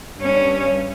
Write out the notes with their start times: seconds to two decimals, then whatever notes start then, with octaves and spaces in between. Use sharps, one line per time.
0.17 G2 C#4